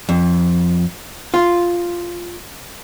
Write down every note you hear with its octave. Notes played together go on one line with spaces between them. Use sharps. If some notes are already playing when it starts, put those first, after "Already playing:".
F2
F4